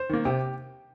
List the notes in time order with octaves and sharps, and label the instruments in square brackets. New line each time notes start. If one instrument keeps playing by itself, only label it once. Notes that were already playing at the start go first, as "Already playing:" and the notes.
Already playing: [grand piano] C5
D#3 A#3
C3 G4